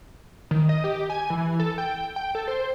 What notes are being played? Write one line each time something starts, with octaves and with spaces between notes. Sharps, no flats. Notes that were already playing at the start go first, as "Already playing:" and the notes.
D#3
D#5
G4
G#5
E3
A4
G5
G5
A4
C5